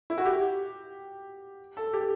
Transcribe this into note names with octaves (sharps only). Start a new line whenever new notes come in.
E4
F#4
G4
A4
G4